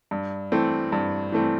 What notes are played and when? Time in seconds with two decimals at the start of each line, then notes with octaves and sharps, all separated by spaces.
0.11 G2
0.52 E3 A3 C4
0.92 G2
1.32 E3 A3 C4